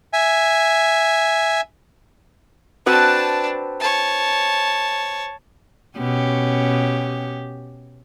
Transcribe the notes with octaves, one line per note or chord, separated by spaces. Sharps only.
E5 G#5
C4 D4 F#4 B4 A5
C#5 A5
B2 C#4 G4